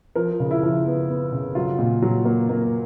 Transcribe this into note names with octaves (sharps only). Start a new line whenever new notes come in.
F3 A#4
C#3
E4
F3
B3
B3
C#3
F#3 F4
A#2
F#3
A#3
A#3